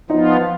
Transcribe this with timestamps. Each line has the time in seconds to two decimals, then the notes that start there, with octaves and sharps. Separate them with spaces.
0.10 F3 B3 D#4 F4